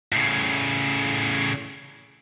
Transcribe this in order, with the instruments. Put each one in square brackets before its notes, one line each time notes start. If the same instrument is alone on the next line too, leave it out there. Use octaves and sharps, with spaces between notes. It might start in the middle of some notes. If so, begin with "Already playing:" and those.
[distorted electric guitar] A2 C#3